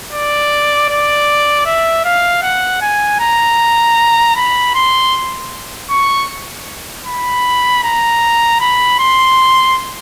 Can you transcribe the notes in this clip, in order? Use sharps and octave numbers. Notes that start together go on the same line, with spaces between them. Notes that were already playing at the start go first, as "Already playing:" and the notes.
D5
D5
E5
F5
F#5
G#5
A#5
B5
C6
C#6
B5
A#5
B5
C6